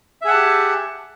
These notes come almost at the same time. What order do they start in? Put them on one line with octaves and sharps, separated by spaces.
E5 G#4 F#5 A5 G4